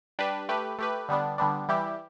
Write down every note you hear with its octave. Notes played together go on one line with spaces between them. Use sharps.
G3 D4 G4 B4
A3 G4 B4
A3 G4 B4
D3 G3 B3 D4
D3 G3 B3 D4
E3 G3 E4 G4